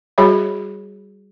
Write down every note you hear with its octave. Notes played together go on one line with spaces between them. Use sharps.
G3 F#4 G#4 C#5 E5 B5